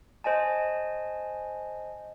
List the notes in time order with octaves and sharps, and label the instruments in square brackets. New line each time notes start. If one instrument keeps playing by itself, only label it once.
[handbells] C5 D#5 G#5 A5